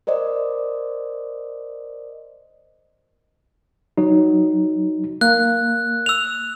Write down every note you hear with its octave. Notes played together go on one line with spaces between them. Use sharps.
A#4 C5 D5 D#5
F#3 D#4
A#3 F#6
E6 F7